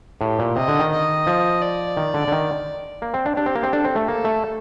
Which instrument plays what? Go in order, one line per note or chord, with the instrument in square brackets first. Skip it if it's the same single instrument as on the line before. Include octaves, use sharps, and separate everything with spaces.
[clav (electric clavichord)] A2 [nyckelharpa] G4
[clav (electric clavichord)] A#2
[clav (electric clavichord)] C3 [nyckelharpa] D#5
[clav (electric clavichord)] D3
D#3
[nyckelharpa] D#5
[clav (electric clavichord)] F3
[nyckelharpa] D5
[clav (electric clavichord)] D#3
D3
D3
D#3
A#3
C4
D4
[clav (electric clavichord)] D4 [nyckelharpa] G4
[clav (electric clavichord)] C4
A#3
C4
[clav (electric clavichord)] D4 [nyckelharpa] A4
[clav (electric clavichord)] C4
A3
[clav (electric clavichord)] A#3 [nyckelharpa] A4
[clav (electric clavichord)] A3